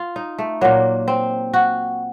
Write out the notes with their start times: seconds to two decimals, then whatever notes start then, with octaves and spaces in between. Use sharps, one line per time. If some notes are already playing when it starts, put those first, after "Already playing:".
Already playing: F4
0.16 D#4
0.38 A3
0.61 A#2 F#3 A#3
1.08 C4
1.54 F#4